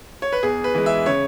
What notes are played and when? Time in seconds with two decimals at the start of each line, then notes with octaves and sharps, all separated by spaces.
0.22 C#5
0.32 B4
0.43 E2 G#4
0.64 B4
0.74 E3 G#3
0.86 E5
1.06 C#3 C#5